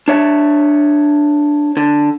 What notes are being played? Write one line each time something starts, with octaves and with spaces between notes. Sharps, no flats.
D4 C#5 E5
D3